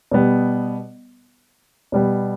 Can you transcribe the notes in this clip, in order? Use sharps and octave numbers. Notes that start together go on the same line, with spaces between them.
B2 G3 B3
B2 G3 B3